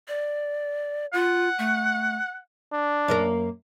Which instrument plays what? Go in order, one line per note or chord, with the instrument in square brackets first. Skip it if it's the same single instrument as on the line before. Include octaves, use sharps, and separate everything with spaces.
[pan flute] D5
[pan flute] F4 [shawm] F#5
[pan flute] A3
[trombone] D4
[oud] F#2 A#3 A#4